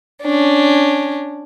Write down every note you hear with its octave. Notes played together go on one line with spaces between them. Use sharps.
C#4 D4